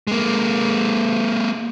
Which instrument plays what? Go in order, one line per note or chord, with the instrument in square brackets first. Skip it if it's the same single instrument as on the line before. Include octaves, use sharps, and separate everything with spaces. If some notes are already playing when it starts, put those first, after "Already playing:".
[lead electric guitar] G#3 A#3